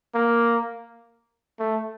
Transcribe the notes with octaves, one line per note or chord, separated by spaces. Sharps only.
A#3
A3